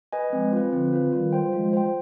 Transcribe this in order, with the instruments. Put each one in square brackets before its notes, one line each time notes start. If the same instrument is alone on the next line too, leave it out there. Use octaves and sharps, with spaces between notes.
[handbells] B4 D#5 G#5
[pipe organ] F3 G#3 [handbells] C4
[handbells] F4 B4
[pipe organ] D3 F3 [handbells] C4
[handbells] F4 B4
[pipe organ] D#3 G3 [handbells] F4
[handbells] C5 G5
[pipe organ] F3 G#3 [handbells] F4
[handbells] C5 G5